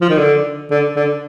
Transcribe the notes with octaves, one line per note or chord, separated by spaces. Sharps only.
F3
D#3
D3
D3
D3